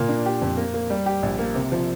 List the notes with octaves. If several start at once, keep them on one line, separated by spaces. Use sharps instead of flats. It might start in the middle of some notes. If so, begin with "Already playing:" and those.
Already playing: A#2 A#3
D4
G4
F2
A#3
A#3
G3
G4
A#1
A#3
C3
F3